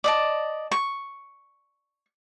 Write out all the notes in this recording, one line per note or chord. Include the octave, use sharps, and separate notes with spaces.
D5 D#5 A5
C#6